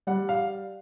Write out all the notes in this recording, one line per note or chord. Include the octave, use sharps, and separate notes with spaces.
G3 F#5
F5